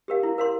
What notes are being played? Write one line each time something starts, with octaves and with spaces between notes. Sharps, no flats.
G4 A#4 F5
E4
A#4 F5 C6